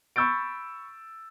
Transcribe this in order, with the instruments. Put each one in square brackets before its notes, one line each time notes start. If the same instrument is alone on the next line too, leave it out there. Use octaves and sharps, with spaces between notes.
[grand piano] B5 C#6 E6 G6 A6 D7